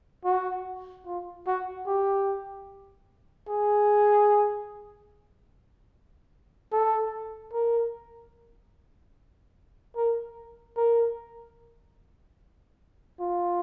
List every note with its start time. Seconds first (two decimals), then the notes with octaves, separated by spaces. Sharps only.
0.25 F#4
1.06 F4
1.47 F#4
1.87 G4
3.49 G#4
6.73 A4
7.53 A#4
9.96 A#4
10.77 A#4
13.20 F4